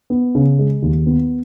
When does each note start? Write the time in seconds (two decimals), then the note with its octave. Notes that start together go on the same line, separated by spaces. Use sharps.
0.10 B3
0.35 C#3
0.59 G#3
0.82 D#2
1.06 B3